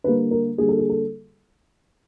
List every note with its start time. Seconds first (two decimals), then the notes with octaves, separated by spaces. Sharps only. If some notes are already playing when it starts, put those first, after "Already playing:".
0.04 D3 G3 A#3 B4
0.31 A#4
0.58 D3 G3 A#3 G#4
0.69 A4
0.79 G#4
0.89 A4